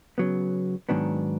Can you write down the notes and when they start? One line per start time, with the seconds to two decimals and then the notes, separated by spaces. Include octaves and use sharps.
0.18 C#3 F#3 B3
0.89 G#2 D#3 F#3 B3 D4